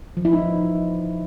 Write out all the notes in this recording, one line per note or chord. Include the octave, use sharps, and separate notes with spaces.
F3
E4
D#4